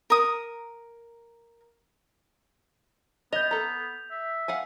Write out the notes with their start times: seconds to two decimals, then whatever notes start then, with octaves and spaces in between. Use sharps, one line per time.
0.10 A#4 D#6
3.33 B3 D#5 G6 F7
3.51 A4 A#5
4.11 E5
4.48 F5 F#5 G#5